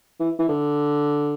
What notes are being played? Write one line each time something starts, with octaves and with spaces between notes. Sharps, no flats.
E3
E3
D3